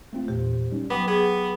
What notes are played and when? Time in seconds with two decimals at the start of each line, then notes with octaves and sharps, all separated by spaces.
0.13 A3 C4 F4
0.28 E2 A#2 G4 C5
0.72 G3 C#4 D#4
0.90 F#3 B3 G5 B5 D6
1.08 B3 G#4